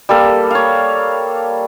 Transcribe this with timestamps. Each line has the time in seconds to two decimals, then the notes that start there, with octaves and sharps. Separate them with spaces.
0.09 G3 A#3 A4
0.51 C#5 F5